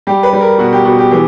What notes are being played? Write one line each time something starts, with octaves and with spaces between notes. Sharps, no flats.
G3 G4
B4
G3
A#4
B2 F#4
G4
B2 F#4
G4
E3 G4